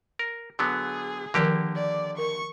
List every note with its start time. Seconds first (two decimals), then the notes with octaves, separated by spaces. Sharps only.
0.19 A#4
0.59 D3 F#3 B3 G#4
1.34 D3 D#3 F3 A#3 G4 A#4
1.75 D5
2.18 A#4 C#6